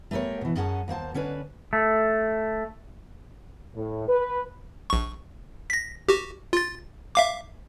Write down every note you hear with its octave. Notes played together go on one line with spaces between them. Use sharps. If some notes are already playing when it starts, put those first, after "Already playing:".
A3 B3 G4 A#4 C#5
B2 E3
F#2 C#4 G#4 F#5 A5
D#2 A#3 C5 A5
D3 C#4 D4 B4
A3
A2
B4
A#1 C#6
A#6 B6
F#4 G4
F4 A6
E5 F5 D6